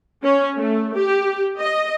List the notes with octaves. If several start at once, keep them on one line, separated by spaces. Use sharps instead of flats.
C#4
A3
G4
D#5